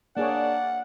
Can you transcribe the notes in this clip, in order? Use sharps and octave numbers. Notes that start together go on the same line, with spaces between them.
A#3 D4 G#4 C#5 D5 F#5